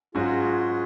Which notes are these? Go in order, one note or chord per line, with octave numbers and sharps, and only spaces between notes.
G#2 F#3 C#4 F4 F#4 G#4